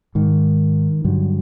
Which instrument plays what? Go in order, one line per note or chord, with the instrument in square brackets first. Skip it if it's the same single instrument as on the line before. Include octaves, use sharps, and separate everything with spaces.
[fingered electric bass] G#2 D#3
G2 D3 F#3